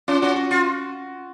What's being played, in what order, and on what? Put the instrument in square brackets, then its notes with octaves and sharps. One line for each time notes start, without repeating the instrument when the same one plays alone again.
[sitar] C#4 [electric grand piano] F4
[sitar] C#4 [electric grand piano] F#4
[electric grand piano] F#4
[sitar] F4